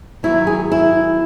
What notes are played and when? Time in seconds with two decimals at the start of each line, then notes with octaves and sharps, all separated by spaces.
0.23 D#3 F#3 B3 E4
0.47 G#4
0.72 E4